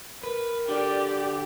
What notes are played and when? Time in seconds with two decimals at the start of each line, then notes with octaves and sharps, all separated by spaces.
0.23 A#4 B4
0.68 D3 G4 D5